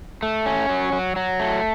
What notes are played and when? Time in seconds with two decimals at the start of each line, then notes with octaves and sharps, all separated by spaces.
0.23 A3
0.46 C#4
0.69 F#3
0.92 F#3
1.16 F#3
1.40 A3